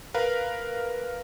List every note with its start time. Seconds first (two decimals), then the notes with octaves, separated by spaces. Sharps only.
0.14 A#4 B4 F5